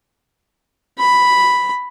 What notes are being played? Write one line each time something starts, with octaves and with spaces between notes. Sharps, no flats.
B5